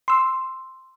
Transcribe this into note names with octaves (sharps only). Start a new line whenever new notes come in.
C6 E6